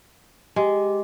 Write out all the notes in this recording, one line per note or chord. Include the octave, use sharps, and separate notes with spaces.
G#3 G4